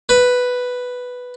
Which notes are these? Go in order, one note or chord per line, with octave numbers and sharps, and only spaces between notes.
B4